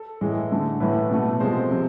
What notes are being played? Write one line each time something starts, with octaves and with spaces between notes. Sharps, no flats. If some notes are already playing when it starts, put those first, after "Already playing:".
Already playing: A4
A2 E3 G#3
D3 A3
A2 E3 A3 B4
B2 A3
C3 F3 G#3 C5
C3 F3